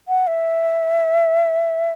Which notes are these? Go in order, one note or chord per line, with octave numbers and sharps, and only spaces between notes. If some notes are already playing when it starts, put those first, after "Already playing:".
F#5
E5